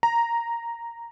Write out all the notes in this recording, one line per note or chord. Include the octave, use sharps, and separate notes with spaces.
A#5